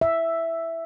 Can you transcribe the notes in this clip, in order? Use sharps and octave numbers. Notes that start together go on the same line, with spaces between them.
E5